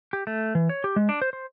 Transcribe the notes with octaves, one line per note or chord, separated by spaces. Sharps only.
G4
A3
E3
C#5
G4
G#3
D4
C5
C5